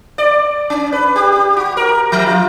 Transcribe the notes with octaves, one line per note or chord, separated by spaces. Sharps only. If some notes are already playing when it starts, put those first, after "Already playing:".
D5
C#4
B4
G4
G4
F#4
A#4
F3
F4